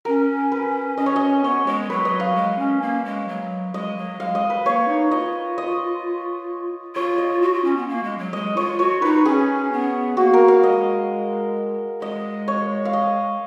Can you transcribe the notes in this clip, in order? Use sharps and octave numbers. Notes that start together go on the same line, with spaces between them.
C#4 A#4
B4
C#4 D#5
C#5
D#5
B3 C#5
G#3 C#5
F#3 B4
D#5
F5
G#3
C#4
A#3
G#3
F#3
G#3 D#5
F#3
G#3 F5
D#5
B4
A#3 C#5
D#4
F4 D#5
D#5
F4 C#5
D#5
F#4
F4
C#4
B3
A#3
G#3
F#3
G#3 D#5
F4 C#5
F#4 C#5
D#4 B4
C#4 G#4
B3
A#3 F#4
A#4
F5
G#3 D#5
G#3 D#5
C#5
F5
D#5